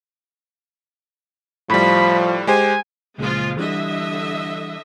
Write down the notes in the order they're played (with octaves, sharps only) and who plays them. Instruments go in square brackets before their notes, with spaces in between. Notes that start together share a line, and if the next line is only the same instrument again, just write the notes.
[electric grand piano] A2 G3 [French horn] F3 [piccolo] B5
[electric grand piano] G#3 G4 C5 [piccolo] G#5
[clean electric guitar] C#2 A#2 [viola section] F3 G#3 F4
[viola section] D3 D#5 E5 [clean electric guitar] E3 G3 D4